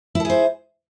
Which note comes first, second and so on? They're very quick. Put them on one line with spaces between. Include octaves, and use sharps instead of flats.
E4 A4 G#4 C5